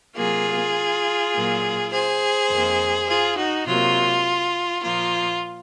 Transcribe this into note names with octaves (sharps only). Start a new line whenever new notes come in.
C3 F#3 A#3 F4 G#4
A#2 F#3 A#3
G#4 C5
F2 D#3 A#3
F4 G#4
D#4 F#4
C3 F#3 A#3 F4
A#2 F3 A#3 F4